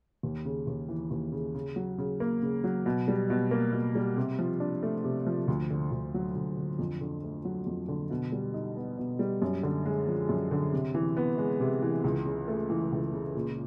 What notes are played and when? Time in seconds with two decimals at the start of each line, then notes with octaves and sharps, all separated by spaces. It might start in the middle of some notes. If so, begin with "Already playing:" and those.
0.23 D#2
0.45 C#3
0.67 D#2
0.88 E3
1.11 D#2
1.32 C#3
1.55 C#3
1.76 F#3
1.98 C#3
2.20 A#3
2.42 C#3
2.64 F#3
2.86 B2
3.08 G3
3.30 B2
3.51 A#3
3.73 B2
3.95 G3
4.17 C3
4.39 F3
4.60 D4
4.83 A3
5.04 C3
5.27 F3
5.48 D2
5.70 D3
5.92 D2
6.14 F#3
6.36 D2
6.57 D3
6.79 F2
7.01 D3
7.24 A3
7.45 F#3
7.67 F2
7.88 D3
8.10 B2
8.32 G3
8.54 D#4
8.76 B3
8.98 B2
9.19 G3
9.42 F#2
9.63 D3
9.85 G#3
10.07 F3
10.29 F#2
10.51 D3
10.73 C3
10.94 E3
11.17 B3
11.38 G#3
11.60 C3
11.82 E3
12.04 C#2
12.26 C#3
12.48 A3
12.70 E3
12.92 C#2
13.14 C#3
13.35 A#2